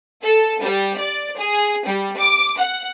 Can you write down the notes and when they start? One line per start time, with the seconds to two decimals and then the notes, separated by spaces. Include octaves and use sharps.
0.23 A4
0.61 G3
0.98 D5
1.38 G#4
1.86 G3
2.18 D6
2.58 F#5